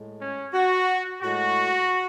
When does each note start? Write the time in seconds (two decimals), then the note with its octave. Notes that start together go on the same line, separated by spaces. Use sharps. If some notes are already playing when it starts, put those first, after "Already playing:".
Already playing: A2 G#3
0.21 C#4
0.53 F#4
1.22 A2 G#3 F#4